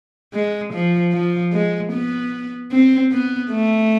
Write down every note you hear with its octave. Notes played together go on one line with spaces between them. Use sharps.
G#3
F3
F3
G#3
B3
C4
B3
A3